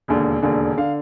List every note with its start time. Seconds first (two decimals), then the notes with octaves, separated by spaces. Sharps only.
0.08 E1 D#2 D3
0.42 E1 D#2 D3
0.78 D3 F5